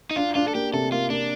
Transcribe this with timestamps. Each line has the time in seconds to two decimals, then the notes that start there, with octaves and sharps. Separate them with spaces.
0.11 D#4
0.16 D4 F4
0.35 D4 F4
0.48 A4
0.54 A#3 G4
0.73 C3 A4
0.92 A#3 F4
1.10 A#3 D4